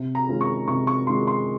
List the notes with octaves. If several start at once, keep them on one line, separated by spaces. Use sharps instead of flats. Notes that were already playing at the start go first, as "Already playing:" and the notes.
Already playing: C3
A#5
D#3 G#3 C#4 F4
C#6
C3 C#6
C#6
D#3 G#3 C#4 F4 C6
C6